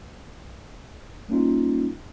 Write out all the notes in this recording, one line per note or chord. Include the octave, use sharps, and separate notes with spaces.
G3 A#3 C#4 D#4 F4